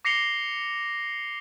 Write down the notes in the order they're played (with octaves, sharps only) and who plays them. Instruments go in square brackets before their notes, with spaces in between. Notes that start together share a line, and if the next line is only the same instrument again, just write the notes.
[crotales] D6 A#6 C7 C#7 F7 G7